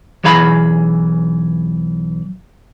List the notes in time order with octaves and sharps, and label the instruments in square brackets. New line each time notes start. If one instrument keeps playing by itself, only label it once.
[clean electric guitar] B1 E3 G#4 F5 B5